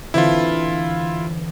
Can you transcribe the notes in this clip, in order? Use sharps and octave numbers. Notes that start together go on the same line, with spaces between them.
D3 E3 C4 E4 F4